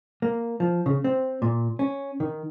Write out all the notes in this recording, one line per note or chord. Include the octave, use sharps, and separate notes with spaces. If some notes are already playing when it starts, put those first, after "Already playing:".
A#3
F3
C#3
C4
A#2
C#4
D#3